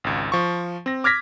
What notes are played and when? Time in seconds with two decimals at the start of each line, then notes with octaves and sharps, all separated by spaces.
0.04 G#1 C#2
0.32 F3 C#6
0.86 C4 A#6
1.04 D6 F6 G#6 A#6 B6